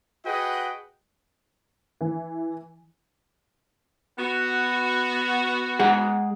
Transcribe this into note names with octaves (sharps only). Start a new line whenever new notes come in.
F#4 G#4 B4 D#5 F#5 G5
E3
B3 F#4
G#3 G#4 F#5